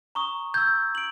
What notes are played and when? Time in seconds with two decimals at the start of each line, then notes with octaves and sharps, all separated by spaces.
0.15 A#5 C#6 D#6
0.54 E6 G6 G#6
0.95 D7 F#7